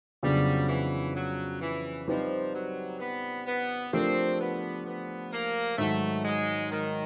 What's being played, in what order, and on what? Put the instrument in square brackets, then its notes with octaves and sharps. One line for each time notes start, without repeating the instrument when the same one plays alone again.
[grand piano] F2 C#3 F#3 B3 D4 [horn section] G3
[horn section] E3
F#3
E3
[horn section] F3 [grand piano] G3 C4 D#4 G4 B4
[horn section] F#3
B3
B3
[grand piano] F3 A3 D4 G4 A#4 [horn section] C4
[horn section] B3
B3
A#3
[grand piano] G#2 D#3 F#3 [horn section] A3
[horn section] G#3
D#3